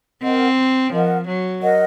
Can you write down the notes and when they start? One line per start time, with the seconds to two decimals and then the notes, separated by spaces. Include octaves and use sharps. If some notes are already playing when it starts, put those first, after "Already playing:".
0.22 C4 A#4 D#5 F#5
0.92 F3 A#4 D#5 F#5
1.27 F#3
1.62 A#4 D#5 F#5